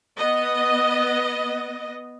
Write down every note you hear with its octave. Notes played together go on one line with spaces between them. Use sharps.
B3 D#5